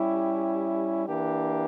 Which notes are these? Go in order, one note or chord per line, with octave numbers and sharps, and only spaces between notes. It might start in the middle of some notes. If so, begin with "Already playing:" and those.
Already playing: G3 C#4 E4 G4
E3 A#3 D4 G4